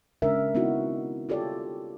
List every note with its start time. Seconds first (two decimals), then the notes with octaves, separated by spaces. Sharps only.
0.22 C#3 G#3 C#4 D4 A#4 E5
0.55 B3 C4 D#4 E4 F#4
1.29 F4 G4 A4 C#5 D5